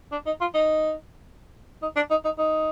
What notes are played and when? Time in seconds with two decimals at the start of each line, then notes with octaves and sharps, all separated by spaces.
0.12 D4
0.26 D#4
0.41 F4
0.54 D#4
1.82 D#4
1.96 D4
2.10 D#4
2.25 D#4
2.38 D#4